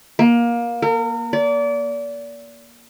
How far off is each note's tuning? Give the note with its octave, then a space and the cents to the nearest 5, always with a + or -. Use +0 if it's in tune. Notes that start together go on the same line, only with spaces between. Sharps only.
A#3 +20
A#4 -35
D5 -30